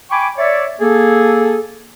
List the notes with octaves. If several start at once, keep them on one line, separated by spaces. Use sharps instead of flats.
G5 G#5 B5 C#6 D6
C#5 D5 E5
A#3 G#4 A4